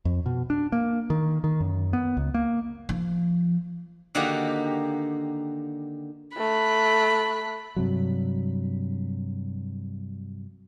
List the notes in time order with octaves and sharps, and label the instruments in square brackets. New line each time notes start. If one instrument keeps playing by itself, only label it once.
[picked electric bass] F2
B2
D4
A#3
D#3
D#3
F#2
B3
C#2
A#3
[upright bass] F3
[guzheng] D3 D#3 A#3 D#4 F#4 G4
[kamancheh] A3 F#6 [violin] B5
[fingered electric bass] G2 C3 F#3